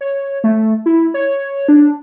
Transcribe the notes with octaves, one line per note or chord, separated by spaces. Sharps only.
C#5
A3
E4
C#5
D4